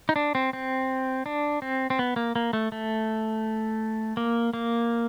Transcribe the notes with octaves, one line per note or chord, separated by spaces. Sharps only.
D#4
D4
C4
C4
D4
C4
C4
B3
A#3
A#3
A3
A3
A#3
A#3